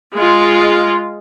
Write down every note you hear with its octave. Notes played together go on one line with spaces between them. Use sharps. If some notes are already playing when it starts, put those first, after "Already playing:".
G#3 F4